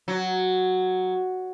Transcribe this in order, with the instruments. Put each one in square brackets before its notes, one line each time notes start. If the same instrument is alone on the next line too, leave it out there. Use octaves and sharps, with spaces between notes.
[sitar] F#3